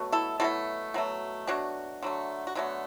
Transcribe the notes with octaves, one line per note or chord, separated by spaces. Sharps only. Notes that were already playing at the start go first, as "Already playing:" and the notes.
Already playing: B2 F#3 A3
E4 A4
B2 F#3 A3 E4 A4
B2 F#3 A3
B2 F#3 A3 D4 F#4
D3 F#3 A3
F#4
D3 F#3 A3 B3 E4